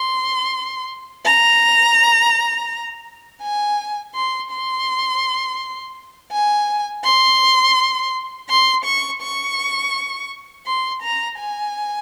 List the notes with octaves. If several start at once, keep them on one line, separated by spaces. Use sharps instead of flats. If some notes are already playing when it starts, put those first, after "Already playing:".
Already playing: C6
A#5
G#5
C6
C6
G#5
C6
C6
C#6
C#6
C6
A#5
G#5